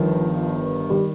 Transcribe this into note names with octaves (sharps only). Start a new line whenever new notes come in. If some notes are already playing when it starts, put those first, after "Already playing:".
Already playing: G1 G2 D#3 F3
D#3 G3